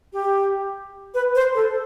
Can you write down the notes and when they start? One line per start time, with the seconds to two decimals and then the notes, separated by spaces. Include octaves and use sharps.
0.13 G4
1.14 B4
1.35 C5
1.55 A4